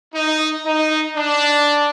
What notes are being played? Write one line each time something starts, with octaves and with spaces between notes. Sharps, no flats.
D#4
D#4
D4